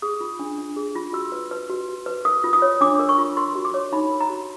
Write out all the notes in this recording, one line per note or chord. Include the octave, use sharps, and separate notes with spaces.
G#4 D#6
F4
D4
D4
G#4
F4
F#4 E6
B4
B4
F#4
F#4
B4
A#4 D#6
F4
D#6
C#5
D4 D6
A#4
C#6
F4
A#4 C6
F#4
D6
C#5
D#4 B5
A#4
A#5
F#4